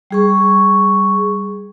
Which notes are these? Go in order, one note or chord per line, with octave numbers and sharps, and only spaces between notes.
G3 G#4 C#6